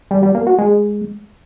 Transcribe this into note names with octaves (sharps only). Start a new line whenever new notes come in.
G3
G3
A#3
F#4
G#3